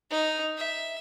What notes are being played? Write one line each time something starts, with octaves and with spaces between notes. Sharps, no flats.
D#4
E5